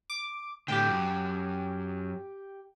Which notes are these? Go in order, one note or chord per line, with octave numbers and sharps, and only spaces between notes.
D6
A2 D3 G4 G5
F#2